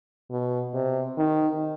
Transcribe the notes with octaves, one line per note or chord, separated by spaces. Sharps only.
B2
C3
D#3